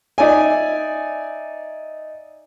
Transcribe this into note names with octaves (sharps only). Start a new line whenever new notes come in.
D#4 D5 E5 G#5